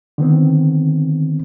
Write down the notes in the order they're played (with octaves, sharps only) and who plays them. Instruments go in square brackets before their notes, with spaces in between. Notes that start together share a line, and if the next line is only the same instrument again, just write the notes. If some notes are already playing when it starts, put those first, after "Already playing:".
[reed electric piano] D3 D#3 B3 C4